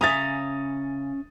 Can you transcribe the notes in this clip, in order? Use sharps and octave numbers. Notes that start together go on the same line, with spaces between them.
C#3 C#4 E5 A#5 D#6 A6